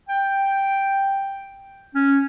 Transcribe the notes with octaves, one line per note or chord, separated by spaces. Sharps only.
G5
C#4